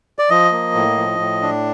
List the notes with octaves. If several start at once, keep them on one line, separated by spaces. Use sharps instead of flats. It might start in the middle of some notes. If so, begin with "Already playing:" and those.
D5
F3 D#5
A#3
A2
F3
A2
D4